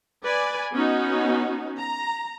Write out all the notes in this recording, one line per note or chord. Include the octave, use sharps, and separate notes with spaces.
B4 D5 G#5
B3 C#4 D#4 F#4
A#5